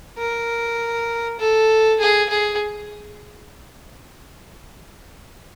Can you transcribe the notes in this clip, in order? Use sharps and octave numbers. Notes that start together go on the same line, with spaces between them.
A#4
A4
G#4
G#4